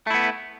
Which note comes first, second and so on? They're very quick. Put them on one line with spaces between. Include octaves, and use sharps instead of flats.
A3 E4 B3